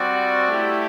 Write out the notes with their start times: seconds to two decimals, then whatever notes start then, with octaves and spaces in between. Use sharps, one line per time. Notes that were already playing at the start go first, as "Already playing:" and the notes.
Already playing: G3 C4 F#4 D5
0.47 A3 E4 G4